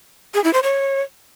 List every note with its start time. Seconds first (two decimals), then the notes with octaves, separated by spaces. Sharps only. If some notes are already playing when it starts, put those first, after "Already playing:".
0.34 G#4
0.44 E4
0.53 C5
0.63 C#5